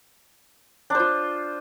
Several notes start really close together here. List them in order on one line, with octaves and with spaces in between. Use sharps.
D4 C5 F4